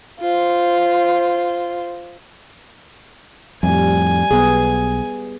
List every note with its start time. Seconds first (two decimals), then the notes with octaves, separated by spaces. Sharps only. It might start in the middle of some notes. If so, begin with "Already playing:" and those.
0.20 F4 C5
3.63 F2 A2 G3 G#5
4.31 B1 B3 G#4